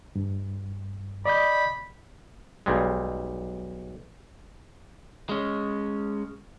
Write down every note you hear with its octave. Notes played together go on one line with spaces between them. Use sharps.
G2
D5 D#5 B5 G6
B1 G3 G#3
G#3 C#4